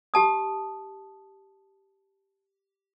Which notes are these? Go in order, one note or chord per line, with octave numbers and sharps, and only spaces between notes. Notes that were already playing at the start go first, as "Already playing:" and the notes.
G4 A5 D#6